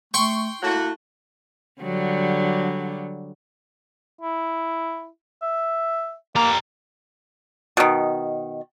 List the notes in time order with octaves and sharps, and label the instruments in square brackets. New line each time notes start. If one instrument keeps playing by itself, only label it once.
[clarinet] A3 [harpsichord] G5 C6 [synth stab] C#6
[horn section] A3 A#3 F#4 [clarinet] E4
[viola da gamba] D3 F#3 G3
[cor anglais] E4
E5
[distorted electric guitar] G3 A#5 [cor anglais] A#3
[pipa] B2 D#3